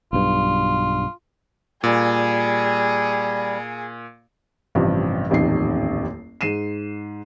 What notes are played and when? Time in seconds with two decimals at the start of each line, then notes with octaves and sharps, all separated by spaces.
0.13 B1 G2 F4
1.84 A#2 G3 G#4
4.75 A1 G2 C3 F3
5.30 D#1 A1 F2 D#3 C7
6.41 G#2 C7 D#7 E7